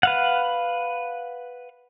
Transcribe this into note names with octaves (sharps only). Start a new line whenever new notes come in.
B4 F5 F#5